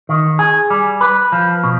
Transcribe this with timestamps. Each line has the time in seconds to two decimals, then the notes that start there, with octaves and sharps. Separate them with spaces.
0.09 D#3
0.39 G#4
0.70 G3
1.01 B4
1.32 F3
1.64 B2